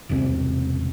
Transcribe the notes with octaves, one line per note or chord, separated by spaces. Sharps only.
E1 C2 C4